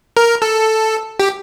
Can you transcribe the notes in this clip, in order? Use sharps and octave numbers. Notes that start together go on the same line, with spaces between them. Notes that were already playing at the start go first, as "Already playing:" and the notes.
A#4
A4
G4